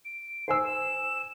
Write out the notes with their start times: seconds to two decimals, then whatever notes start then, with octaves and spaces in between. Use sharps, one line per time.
0.05 D7
0.48 C5 G#5 E6 C7
0.65 E7